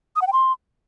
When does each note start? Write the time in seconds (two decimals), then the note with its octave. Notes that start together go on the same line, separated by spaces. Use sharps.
0.16 D#6
0.21 F#5
0.27 G5
0.33 C6